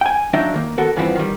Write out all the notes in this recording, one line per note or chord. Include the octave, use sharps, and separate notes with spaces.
G5 G#5
D#2 F#3 D4 D#4 E5 G5
D#3 A#3
B3 F#4 A4 A#4
E2 G2 E3 F3 B3 C4
D#3 G3